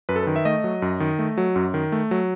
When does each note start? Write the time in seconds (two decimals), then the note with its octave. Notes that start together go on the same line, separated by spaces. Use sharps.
0.09 F#2 B4
0.16 A4
0.23 D#3 B4
0.36 E5
0.45 A3 D#5
0.64 F#3
0.82 F#2
1.00 D#3
1.19 A3
1.38 F#3
1.56 F#2
1.74 D#3
1.92 A3
2.11 F#3